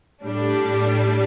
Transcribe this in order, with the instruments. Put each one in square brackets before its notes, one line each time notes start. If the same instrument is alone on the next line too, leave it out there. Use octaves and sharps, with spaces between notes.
[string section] A2 G3 D4